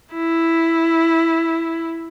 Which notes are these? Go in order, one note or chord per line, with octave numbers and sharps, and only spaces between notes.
E4